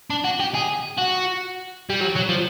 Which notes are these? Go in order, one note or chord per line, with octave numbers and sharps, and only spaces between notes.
D4
F#4
G4
G#4
F#4
G3
F#3
F#3
F3